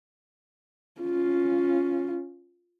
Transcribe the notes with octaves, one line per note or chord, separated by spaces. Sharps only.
C#4 F4